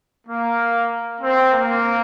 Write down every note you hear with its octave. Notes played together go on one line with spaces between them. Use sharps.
A#3
C4
A#3